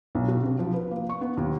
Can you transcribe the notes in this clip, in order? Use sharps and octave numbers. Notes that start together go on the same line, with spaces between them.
B1
F#4
C3
F3
B4
A#3
C#6
B3
D#2